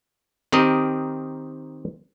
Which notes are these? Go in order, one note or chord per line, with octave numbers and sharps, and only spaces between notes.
D#3 C4 G4 A#4 D#5